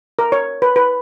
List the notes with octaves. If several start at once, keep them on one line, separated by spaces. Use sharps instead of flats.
A#4
C#5
B4
B4